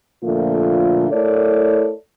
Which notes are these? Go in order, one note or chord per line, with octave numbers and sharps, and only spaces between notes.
A#2 D3 F3 A3 A#3 F4
A3 E4 A4 A#4 C#5 D5